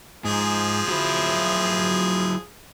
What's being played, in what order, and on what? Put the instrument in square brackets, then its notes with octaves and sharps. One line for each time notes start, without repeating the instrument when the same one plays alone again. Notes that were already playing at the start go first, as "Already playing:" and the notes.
[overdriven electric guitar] G#2 [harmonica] F3 G#4
[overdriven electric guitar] F#3 E4